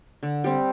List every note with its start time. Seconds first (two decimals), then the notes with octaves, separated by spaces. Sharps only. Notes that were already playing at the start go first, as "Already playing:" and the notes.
0.23 D3
0.44 G3 C4